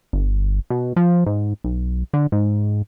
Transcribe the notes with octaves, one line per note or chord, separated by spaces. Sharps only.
G1
B2
F3
G#2
B1
D3
G#2